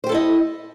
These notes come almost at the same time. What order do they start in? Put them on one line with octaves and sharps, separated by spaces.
C5 G4 A4 E4 D#5